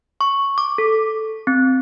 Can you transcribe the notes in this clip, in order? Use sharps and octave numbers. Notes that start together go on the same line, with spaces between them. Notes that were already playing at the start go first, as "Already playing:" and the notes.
C#6
D6
A4
C4